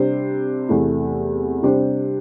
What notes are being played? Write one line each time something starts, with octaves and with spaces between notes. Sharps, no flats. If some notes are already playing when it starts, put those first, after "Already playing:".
Already playing: C3 G3 D4 G4 C5
E2 C3 A3 E4
C3 G3 D4 G4 C5